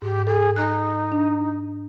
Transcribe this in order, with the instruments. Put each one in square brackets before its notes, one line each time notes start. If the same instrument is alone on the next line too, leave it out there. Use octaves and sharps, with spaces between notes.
[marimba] G#2 [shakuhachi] G4
[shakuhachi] G#4 [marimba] A4
[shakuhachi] D#4 [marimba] F#6
[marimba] D4